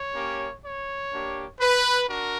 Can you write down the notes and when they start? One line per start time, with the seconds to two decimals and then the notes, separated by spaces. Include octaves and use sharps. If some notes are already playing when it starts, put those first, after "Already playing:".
Already playing: C#5
0.14 A#3 C#4 G4
0.62 C#5
1.12 A#3 D4 G4
1.60 B4
2.08 D4 F#4 A#4